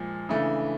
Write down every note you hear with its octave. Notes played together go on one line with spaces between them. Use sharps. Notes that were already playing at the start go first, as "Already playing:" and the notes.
Already playing: A#2 F3 G#3
C#3 E3 A3 D4